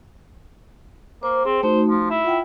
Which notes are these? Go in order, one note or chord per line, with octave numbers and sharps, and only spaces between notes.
A#3 C5
C4 G#4
A3 D#4 F#4 C5
F3
E4
F4 F#5 G5